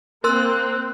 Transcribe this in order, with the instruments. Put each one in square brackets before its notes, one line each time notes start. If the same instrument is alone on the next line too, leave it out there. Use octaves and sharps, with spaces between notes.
[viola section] A#3 C4 [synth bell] A#4 C6 E6 [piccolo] F#6